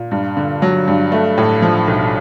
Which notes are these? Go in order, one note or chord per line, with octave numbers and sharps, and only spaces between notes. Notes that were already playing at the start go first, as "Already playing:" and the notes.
Already playing: A#2
G2
D3
F#3
G2
A3
A2
F3
B1